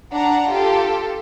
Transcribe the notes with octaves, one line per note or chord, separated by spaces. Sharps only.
D4 F#5 A#5
F4 G4 A4